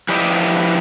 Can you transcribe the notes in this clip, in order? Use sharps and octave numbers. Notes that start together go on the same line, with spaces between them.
F3 E4 G4 B4 D5 D#5